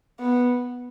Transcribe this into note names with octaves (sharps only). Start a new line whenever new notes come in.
B3